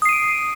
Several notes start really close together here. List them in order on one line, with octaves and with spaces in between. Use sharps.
D#6 C7 D#7 D7